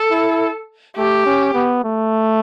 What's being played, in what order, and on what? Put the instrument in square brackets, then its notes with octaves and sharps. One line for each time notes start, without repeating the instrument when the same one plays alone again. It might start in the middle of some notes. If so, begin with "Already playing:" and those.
Already playing: [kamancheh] A4
[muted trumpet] E4
[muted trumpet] A3 [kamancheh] G4
[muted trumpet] C#4
B3
A3